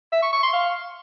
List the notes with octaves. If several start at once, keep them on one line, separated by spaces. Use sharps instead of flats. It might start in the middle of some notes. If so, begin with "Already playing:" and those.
E5
C#6
C#6
C6
F5